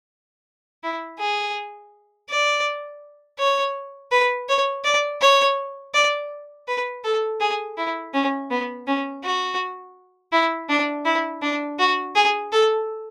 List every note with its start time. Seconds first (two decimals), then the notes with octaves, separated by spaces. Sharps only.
0.83 E4
1.19 G#4
2.29 D5
3.39 C#5
4.11 B4
4.49 C#5
4.84 D5
5.21 C#5
5.94 D5
6.68 B4
7.04 A4
7.41 G#4
7.77 E4
8.14 C#4
8.50 B3
8.87 C#4
9.24 F#4
10.32 E4
10.69 D4
11.05 E4
11.42 D4
11.79 F#4
12.15 G#4
12.52 A4